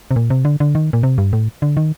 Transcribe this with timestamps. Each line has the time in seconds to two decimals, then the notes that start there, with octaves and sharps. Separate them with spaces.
0.11 C3
0.16 A#2
0.30 C3
0.45 D3
0.60 D3
0.75 D#3
0.93 A#2
1.03 C3
1.18 G2
1.33 A2
1.62 D3
1.77 D#3